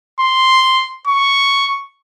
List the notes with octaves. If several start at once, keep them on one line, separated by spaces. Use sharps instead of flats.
C6
C#6